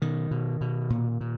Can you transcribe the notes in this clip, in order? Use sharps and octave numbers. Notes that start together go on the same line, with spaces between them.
B2 D#3
B2
B2
A#2
A#2